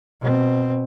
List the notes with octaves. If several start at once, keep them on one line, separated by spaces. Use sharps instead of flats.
B2 C4